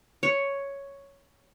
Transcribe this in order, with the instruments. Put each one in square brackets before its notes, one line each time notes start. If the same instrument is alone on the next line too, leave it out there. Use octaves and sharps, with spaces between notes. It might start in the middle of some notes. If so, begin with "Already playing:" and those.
[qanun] C#5